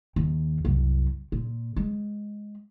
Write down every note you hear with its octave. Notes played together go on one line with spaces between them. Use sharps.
D#2
C2 F#2
A#2
G#3